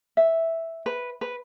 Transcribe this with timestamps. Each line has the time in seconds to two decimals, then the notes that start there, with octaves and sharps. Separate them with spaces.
0.17 E5
0.86 B4
1.21 B4